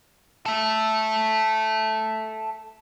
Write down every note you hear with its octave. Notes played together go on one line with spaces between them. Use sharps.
A4 E5